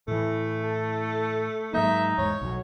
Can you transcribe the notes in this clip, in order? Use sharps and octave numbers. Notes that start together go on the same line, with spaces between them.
A2 E3 A3
A4
G#2 F#3 A#3 D#4 E5
E2 G#2 C#5
B1 F#3